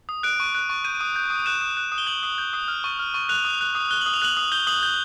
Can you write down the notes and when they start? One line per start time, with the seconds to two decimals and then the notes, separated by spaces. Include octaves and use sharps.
0.09 D#6
0.23 F#6 D7
0.40 C#6
0.55 F#6
0.70 C#6
0.84 G6 D#7
1.01 D#6
1.16 G6
1.30 D#6
1.46 F#6 E7
1.61 D#6
1.77 F#6
1.92 D#6
1.98 G7
2.07 G6 F#7
2.23 D#6
2.38 G6
2.53 D#6
2.68 F6
2.84 C#6
2.99 F6
3.14 C#6
3.29 F#6 F7
3.45 D#6
3.61 F#6
3.75 D#6
3.91 F#6 G7
4.01 D#6 F#7
4.14 F7
4.22 F#6 F#7
4.37 D#6
4.52 G6 G7
4.67 D#6 F#7
4.83 G6 G7